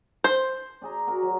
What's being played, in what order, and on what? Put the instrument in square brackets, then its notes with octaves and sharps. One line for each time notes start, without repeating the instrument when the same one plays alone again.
[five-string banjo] C5
[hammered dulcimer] D4 G#4 A#5
F#4 A#4
F#3